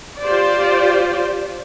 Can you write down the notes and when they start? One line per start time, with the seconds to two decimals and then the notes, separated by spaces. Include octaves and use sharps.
0.23 F4 G4 C5 D5